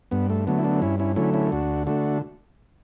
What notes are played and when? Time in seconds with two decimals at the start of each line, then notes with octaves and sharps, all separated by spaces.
0.11 G2 B3
0.30 A3
0.47 D3 F#3 A3 B3
0.58 E4
0.64 B3 D4
0.82 G2 C#4 E4
1.00 C#4 E4
1.16 D3 F#3 A3 C#4 E4
1.34 C#4 E4
1.52 D2 D4 F#4
1.87 D3 A3 D4 F#4